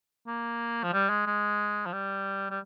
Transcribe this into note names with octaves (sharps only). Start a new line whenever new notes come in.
A#3
F3
G3
G#3
G#3
F3
G3
G3